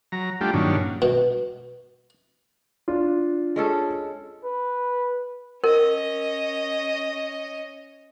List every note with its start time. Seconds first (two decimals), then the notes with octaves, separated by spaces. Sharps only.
0.12 F#3 A#5
0.41 G3 A3 D4 F4 G4
0.53 G2 A#2 D#3 F#3 C#4 D4
1.02 B2
2.88 D4 F4
3.56 G#3 C#4 A4
4.44 B4
5.64 C#4 A#4 D#5